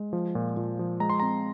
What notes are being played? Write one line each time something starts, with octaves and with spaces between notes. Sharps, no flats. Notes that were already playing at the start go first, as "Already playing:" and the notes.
Already playing: G#3
F3
A#2
A#2
F3
G#3 A#5
C6
C4 A#5